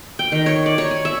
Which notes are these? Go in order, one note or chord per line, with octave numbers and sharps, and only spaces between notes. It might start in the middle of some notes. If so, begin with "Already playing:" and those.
G5
D#3
C#5
D5
C#5
G#5
E5